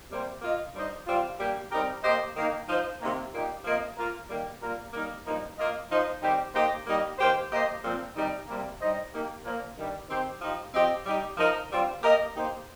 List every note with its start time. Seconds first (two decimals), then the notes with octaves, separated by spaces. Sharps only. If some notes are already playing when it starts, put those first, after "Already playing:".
0.10 C3 G3 A#3 G4 C5
0.41 A#3 F4 D#5
0.74 G2 G3 D#4 C5 D#5
1.07 C3 G3 C4 F4
1.39 G2 G3 A#3 G4
1.71 G3 C4 D#4 G4 A#4
2.03 A#3 G4 C5 D#5
2.35 D#3 A#3 D#4
2.68 F3 D#4 C5
3.00 C3 D#3 A#3
3.32 A#2 A#3 D#4 G4
3.64 C3 F3 A#3 F4 D#5
3.96 A#3 F4 A#4
4.29 D#3 G3 A#3 G4
4.61 A#2 G3 A#3 F4 A#4
4.93 G3 A#3 D#4 A#4
5.25 G2 F3 A#3 D#4
5.57 A#3 F4 D#5
5.90 F3 D#4 C5
6.22 D#3 G3 C4 D#4 G4
6.54 A#3 D#4 G4 C5 D#5
6.86 G3 A#3 D#4 G4 D#5
7.19 D#3 A#3 G4 C5
7.51 A#3 G4 C5 D#5
7.83 A#2 F3 C4
8.15 C3 D#3 G3 D#4
8.47 C3 G3 A#3
8.80 G2 G3 D#4 C5 D#5
9.12 A#3 D#4 G4
9.44 A#2 F3 A#3
9.76 G2 D#3 G3
10.08 D#3 C4 G4 C5
10.41 F3 D#4 G4
10.73 F3 C4 G4 C5 D#5
11.05 G3 D#4 G4
11.37 F3 D#4 A#4
11.69 G2 G3 C4 F4
12.01 A#3 G4 A#4 D#5
12.34 A#3 D#4 G4 C5